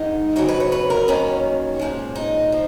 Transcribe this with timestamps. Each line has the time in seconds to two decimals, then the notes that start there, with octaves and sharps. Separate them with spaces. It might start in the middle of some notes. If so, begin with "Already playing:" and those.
Already playing: G#2 D#3 G#3 D#4
0.36 F2 C#3 F#3 A#4
0.48 B4
0.60 C#5
0.72 B4
0.90 A#4
1.08 D#2 D#3 F#3 C#4
1.80 A#2 F3 G#3
2.15 D#4
2.52 F3